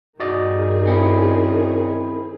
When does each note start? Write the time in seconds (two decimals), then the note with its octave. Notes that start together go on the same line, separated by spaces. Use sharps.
0.20 G2 D#3 F#4 G#4 D5 D#5
0.86 C4 C#4 E4